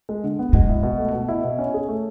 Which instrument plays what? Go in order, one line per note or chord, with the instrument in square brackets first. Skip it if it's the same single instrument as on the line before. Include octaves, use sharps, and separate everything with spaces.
[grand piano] G#3
D3
B3
[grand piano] B2 [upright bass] G#3
[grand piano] E4
B2
A3
B2
E4
B2
C#4
G#4
A3